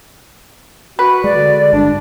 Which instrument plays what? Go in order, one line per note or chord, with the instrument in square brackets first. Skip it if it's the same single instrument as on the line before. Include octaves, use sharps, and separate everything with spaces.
[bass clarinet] F#4 [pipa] B4
[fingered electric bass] G#3 [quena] D5
[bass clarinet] D3
[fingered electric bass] G1 [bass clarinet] D4